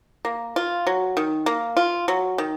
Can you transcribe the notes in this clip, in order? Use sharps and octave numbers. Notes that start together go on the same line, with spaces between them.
A#3
F4
F#3
D#3
A#3
F4
F#3
D#3